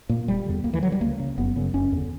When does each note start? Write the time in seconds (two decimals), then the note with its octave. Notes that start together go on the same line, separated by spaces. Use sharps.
0.09 A#2 A#3
0.28 E1 G3
0.46 E2 D3
0.64 D2 A#3
0.73 E3
0.83 D3 F#3
0.92 G3
1.01 C#2 A#3
1.20 C#3
1.38 F#1 B3
1.56 F#2 C#3
1.74 F#1 C#4
1.92 E2
1.97 D3